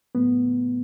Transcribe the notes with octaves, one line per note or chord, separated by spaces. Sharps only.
A2 F#3 A3 B3